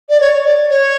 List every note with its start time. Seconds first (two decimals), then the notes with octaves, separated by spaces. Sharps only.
0.09 D5
0.20 C#5
0.45 D5
0.70 C#5